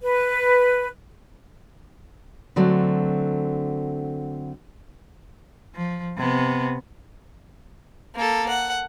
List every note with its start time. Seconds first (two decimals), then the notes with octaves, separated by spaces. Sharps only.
0.02 B4
2.56 D3 F#3 A3 C4
5.75 F3
6.17 C3 B3
8.15 A#3 A4
8.49 F#5